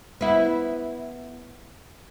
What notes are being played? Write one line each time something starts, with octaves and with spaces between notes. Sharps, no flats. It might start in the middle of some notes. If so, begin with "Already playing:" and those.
B3 E4